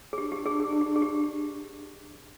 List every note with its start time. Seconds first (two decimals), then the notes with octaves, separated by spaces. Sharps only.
0.13 G#4
0.18 D4 G4
0.32 G4
0.46 G#4
0.60 G#4
0.73 G#4
0.81 G4
0.96 G#4
1.02 G4